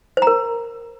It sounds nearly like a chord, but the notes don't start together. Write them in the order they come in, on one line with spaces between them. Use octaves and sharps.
C5 A#5 A#4